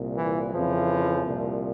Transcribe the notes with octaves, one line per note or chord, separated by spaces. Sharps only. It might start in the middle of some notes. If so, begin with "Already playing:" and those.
Already playing: C2 A#2
E3
F2 C#3 E3 F3
C2 A#2